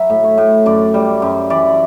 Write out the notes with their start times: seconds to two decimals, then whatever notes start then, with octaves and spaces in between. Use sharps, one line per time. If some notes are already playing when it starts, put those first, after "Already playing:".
Already playing: F#3 B4 E5
0.10 A2
0.24 C#5
0.38 A2
0.66 F#2 D5
0.94 G3
1.22 F#2
1.50 E3 D5